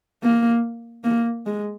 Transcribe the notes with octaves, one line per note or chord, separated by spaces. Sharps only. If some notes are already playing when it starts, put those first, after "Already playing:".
A#3
A#3
G#3